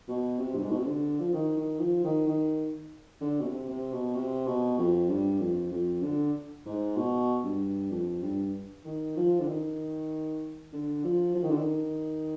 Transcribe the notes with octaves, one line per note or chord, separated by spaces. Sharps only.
B2
C3
G2
G#2
B2
C3
D3
F3
D#3
D#3
F3
D#3
D#3
D3
B2
C3
C3
B2
C3
B2
F2
G2
F2
F2
D3
G#2
B2
G2
F2
G2
D#3
F3
D3
D#3
D3
F3
F3
D#3
D3
D#3